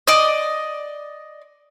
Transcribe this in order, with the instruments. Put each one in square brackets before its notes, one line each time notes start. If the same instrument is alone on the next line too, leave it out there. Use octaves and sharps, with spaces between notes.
[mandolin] D5 D#5